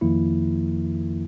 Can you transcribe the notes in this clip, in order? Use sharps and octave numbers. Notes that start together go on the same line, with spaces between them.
F2 D#3 F3 A#3 E4